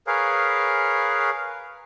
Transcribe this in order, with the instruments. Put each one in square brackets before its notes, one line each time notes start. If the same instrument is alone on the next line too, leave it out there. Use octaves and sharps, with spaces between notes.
[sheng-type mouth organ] G#4 A#4 B4 C#5 F5